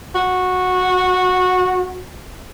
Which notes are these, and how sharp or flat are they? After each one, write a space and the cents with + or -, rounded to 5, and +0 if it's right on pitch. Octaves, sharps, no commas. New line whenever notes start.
F#4 -15